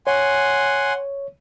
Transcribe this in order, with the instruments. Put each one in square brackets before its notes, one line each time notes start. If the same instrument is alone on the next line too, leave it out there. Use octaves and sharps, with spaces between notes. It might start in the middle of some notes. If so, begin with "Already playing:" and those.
[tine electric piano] C#5 [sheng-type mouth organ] F#5 G#5 C6